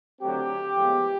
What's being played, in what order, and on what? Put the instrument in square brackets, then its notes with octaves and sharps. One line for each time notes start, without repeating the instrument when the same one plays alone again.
[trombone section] D3 F#3 A3 C4 G4
A2 F3 G#3 B3